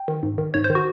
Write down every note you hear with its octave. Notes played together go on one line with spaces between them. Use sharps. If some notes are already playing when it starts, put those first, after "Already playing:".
Already playing: G5
D#3
G#2
D#3
G#2 C#5
C5
D#3
F#4